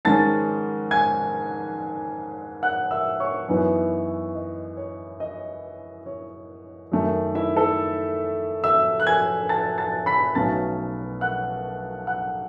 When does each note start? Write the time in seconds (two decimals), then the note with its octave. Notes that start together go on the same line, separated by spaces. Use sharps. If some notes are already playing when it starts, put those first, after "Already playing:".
0.05 G#2 D#3 G#3 C#4 A5 A6
0.91 G#5 G#6
2.63 F#5 F#6
2.91 E5 E6
3.20 C#5 C#6
3.48 F#2 E3 B3 D#4
4.35 D#5
4.77 C#5
5.20 D#5
6.06 C#5
6.92 F#2 D#3 A3 D#4
7.35 E4 E5
7.56 A4 A5
8.64 E5 E6
9.00 F#6
9.06 G#5 G#6
9.49 A5 A6
9.78 A5 A6
10.06 B5 B6
10.35 B1 B2 F#3 A3 C#4 A5 A6
11.21 F#5 F#6
12.07 F#5 F#6